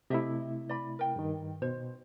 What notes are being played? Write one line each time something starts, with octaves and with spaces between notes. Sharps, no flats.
C3 A3 E4 G4 D#5 E5
D5 B5
A#4 G5
G2 D#3
B2 C5